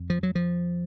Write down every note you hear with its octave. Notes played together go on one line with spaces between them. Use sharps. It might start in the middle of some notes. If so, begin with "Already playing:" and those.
Already playing: F2
F3
F#3
F3